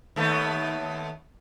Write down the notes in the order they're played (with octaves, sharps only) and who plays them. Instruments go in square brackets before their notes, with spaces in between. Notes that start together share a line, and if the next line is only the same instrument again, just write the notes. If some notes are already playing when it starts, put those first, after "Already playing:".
[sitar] D#2 A3 B3